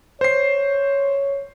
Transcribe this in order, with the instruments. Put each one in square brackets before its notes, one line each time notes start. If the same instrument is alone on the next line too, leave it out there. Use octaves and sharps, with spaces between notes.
[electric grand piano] C5 C7 [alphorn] C#5